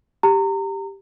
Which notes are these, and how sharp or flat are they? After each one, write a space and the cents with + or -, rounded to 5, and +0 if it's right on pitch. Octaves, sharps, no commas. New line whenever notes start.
G4 +0 A#5 -30